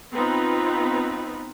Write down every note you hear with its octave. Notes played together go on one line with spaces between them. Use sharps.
B3 C4 D#4 F4 B4